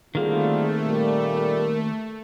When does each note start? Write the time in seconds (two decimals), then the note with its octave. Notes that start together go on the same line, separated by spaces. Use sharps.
0.15 D3 D#3 G3 A3 A#3 C4 F4 G#4
0.85 A#2 G3 A#4